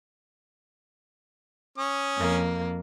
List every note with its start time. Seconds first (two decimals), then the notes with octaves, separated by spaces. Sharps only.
1.78 C#4 D#6
2.16 F2 A#3